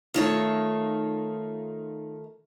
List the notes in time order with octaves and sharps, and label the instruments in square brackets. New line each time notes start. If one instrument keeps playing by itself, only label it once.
[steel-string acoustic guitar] D#3 A3 C#5 [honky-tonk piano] D#4 F4